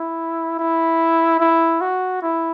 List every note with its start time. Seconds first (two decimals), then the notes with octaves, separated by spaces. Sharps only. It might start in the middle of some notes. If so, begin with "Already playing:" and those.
Already playing: E4
0.59 E4
1.40 E4
1.81 F#4
2.22 E4